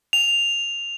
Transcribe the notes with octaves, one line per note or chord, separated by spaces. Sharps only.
F7